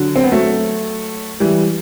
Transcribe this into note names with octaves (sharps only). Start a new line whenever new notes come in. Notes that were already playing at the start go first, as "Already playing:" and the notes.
Already playing: D3 F#3
C4
B3
F#3 A3
E3 G3